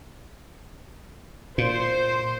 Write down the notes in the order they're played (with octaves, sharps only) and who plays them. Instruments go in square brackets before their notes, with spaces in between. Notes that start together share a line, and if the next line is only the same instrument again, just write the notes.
[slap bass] A#2 [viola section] C5